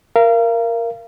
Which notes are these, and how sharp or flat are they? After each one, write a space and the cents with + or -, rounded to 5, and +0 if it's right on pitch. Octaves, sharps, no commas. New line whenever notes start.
A#4 +0 F5 -35